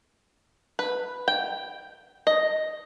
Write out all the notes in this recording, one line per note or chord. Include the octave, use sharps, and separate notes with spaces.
B4
G5
D#5